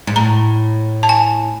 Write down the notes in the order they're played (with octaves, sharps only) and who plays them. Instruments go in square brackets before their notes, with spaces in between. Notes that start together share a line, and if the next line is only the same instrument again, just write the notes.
[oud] G#2
[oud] A2 [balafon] A#5
[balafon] A5
G#5